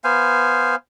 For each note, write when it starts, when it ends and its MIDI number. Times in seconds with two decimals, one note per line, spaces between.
0.04 0.75 59
0.04 0.75 72
0.04 0.75 77
0.04 0.75 80